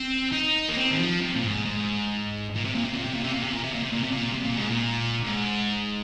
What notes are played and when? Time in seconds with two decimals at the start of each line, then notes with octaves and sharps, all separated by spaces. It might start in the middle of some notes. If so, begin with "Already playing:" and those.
Already playing: C4
0.32 D#4
0.69 A#3
0.77 C4
0.91 D#3
0.99 F3
1.21 C3
1.35 A#2
1.43 G#2
1.65 G#2
2.55 A#2
2.65 C3
2.75 A#2
2.84 C3
2.95 A#2
3.04 C3
3.15 A#2
3.24 C3
3.34 A#2
3.43 C3
3.53 A#2
3.64 C3
3.74 A#2
3.83 C3
3.93 A#2
4.04 C3
4.12 A#2
4.34 C3
4.45 A#2
4.57 G#2
4.68 A#2
5.24 G#2